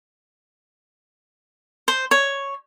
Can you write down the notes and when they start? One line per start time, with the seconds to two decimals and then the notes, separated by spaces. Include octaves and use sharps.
1.88 C5
2.11 C#5